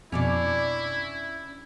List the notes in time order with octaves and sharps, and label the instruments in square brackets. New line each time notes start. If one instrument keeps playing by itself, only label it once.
[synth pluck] F2 B2 [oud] C#4 D4 D5 [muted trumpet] E4